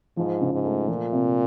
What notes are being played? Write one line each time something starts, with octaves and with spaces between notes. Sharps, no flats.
G#2 F3
C#3
G#2
A3
A#2 F3
C3